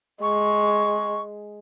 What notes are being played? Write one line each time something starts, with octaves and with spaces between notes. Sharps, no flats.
G#3 C#6